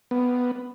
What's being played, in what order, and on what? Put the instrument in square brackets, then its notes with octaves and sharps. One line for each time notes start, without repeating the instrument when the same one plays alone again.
[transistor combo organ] B3